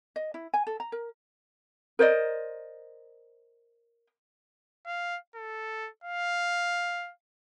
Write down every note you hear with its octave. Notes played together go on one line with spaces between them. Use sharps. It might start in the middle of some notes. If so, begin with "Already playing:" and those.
D#5
E4
G#5
A4
A#5
A#4
A#4 C5 D5 D#5
F5
A4
F5